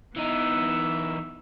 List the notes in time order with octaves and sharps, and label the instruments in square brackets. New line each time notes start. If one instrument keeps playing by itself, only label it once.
[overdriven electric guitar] E3 D#4 [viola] B3 E5